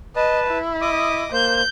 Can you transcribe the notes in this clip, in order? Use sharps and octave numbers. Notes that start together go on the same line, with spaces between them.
B4 D#5 A5
E4
D#5 D6 D#6
A#3 C5 G6